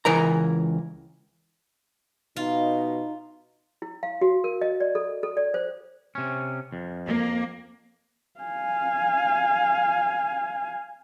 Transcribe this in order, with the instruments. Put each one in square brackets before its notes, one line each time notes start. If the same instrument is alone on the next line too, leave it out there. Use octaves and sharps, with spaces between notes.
[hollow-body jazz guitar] C#2 E3 A#4 A#5
[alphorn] B2 [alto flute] D#4 [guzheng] F4
[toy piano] E4
F5
F#4
A#4
D#5
D5
A4
A4
D5
C5
[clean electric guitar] C3 C#4
F2
[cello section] A#3
[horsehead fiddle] F5 G#5